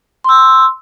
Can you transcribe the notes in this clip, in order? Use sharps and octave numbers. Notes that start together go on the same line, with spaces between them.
C6 E6